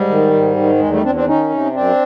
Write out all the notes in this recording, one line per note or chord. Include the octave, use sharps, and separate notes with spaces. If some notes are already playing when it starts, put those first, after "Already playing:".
Already playing: G#2 G3
D#3
G#2
D#3
E2 G#3
G3 A3
E2 C4 D4
C4 D4
D#3 C#4 D#4
C3
F#2 C4 D4